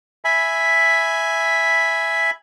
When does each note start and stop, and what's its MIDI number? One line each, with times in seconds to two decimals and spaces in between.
0.25 2.31 76
0.25 2.31 80
0.25 2.31 83